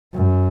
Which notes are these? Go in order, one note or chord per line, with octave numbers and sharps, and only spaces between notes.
F#2